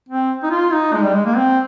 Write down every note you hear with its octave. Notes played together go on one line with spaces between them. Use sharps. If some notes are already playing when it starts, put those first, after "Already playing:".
C4
D#4
F4
D#4
G#3
G3
G#3
A#3
C4